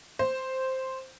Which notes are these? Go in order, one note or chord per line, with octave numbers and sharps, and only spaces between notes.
C5